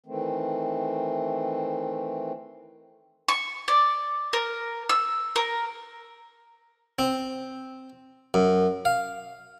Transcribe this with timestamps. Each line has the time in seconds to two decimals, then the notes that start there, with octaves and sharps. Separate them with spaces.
0.06 D#3 E3 A3 C4
3.28 C#6
3.68 D5
4.33 A#4
4.89 E6
5.36 A#4
6.99 C4
8.34 F#2
8.85 F5